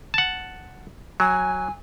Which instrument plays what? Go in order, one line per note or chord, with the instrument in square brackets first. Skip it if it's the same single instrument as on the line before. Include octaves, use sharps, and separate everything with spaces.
[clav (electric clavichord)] F#5 A5
[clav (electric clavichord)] F#3 [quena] G#5